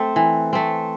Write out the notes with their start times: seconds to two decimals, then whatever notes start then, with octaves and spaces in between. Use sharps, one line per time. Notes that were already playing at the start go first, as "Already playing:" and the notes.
Already playing: A3 C4
0.16 E3
0.53 A3 C4